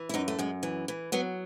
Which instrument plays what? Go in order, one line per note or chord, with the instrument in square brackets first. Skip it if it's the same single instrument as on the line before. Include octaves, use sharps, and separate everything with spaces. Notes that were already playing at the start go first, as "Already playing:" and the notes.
Already playing: [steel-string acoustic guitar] E3
E4
F#2 D#4
A3
F#2 G#3
E3
E3
F#3 B3